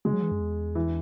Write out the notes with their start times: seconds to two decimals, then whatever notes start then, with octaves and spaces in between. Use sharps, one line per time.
0.05 C#3 G#3
0.13 F#3
0.23 E3
0.32 F#2
0.40 E2
0.75 E3